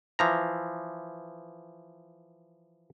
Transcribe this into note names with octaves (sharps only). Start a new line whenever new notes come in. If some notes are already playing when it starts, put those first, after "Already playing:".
E3 F3 A#5